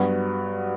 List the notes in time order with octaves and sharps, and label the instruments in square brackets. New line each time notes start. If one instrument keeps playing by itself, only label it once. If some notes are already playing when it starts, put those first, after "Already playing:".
Already playing: [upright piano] G2 F#3 B3 F#4